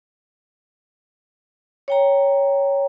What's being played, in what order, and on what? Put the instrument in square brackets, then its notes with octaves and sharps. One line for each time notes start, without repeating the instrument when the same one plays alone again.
[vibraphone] C#5 G5 A#5